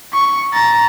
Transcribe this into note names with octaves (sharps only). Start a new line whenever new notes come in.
C#6
A#5 A6